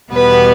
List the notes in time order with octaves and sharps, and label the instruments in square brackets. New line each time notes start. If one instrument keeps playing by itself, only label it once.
[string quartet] E2 B2 G3 B3 B4